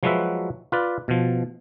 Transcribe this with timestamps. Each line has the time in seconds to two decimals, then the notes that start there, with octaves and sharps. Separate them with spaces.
0.03 F3 F#3 G#3 F#4 B4 E5
0.72 F4 B4 D5
1.08 B2 F3